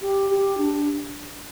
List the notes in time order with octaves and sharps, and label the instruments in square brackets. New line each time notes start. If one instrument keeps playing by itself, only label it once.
[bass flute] G4
G4
D4